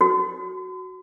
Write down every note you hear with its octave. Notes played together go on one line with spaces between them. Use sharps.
F#4